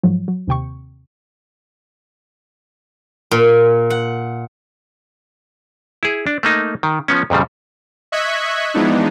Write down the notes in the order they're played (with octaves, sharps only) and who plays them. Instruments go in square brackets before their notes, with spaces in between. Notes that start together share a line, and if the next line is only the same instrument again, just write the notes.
[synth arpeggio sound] G#2 F3 F#3
F#3
D#2 C3 G5 C#6
[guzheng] A#2
F#5
[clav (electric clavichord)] E4 G#4
D4
A3 A#3 D#4
D#3
F3 B3 C#4
F2 A#2 C#3 G3
[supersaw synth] D#5 E5 C#6 F#6 G#6 B6
E3 F3 G#3 B3 D4 D#4